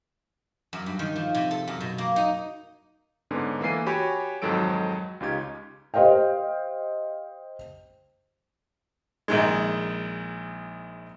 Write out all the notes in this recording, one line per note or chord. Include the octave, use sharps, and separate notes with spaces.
F#2
G2
D#3
F3
C3
A4
F#2
B2
A#3
D#4
G#2 D3 B3 C#4
E3 A#3 A4 C7 D#7
F#4 G4 C#5 G#5 B5
F2 G#2 D#3 F#3 A4 D7
C#2 C#4 D#4 F4 G4 G#6
G4 C5 D#5 F5 G5
A#1 D#3 G#3